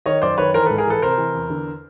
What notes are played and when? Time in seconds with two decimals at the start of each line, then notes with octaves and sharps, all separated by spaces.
0.06 D#3 C#5 D#5
0.22 F#2 C5 D5
0.38 D#3 B4 C#5
0.54 E3 A#4 C5
0.66 G#2 A4 B4
0.78 G#4 A#4
0.87 E3 A4 B4
1.02 C3 A#4 C5
1.18 E3
1.35 E2
1.50 D3